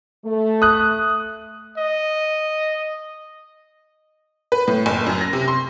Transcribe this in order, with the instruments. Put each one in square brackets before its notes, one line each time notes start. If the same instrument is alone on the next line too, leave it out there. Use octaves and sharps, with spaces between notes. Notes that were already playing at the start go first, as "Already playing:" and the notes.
[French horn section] A3
[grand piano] D#6 F#6
[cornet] D#5
[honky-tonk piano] B4
A2
F#1
F#2
A#6
C3
C6